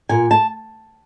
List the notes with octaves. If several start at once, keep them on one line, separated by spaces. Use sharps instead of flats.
A#2 G#5
A5